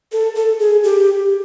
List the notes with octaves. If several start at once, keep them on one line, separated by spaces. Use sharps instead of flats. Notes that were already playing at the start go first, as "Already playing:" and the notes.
A4
A4
G#4
G4